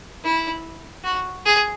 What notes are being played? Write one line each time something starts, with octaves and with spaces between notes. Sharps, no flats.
E4
F#4
G#4